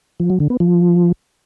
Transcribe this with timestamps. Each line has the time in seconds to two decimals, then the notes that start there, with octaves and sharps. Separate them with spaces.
0.20 F3
0.30 F#3
0.40 D3
0.50 B3
0.60 F3